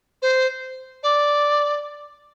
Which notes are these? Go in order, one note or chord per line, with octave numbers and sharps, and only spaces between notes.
C5
D5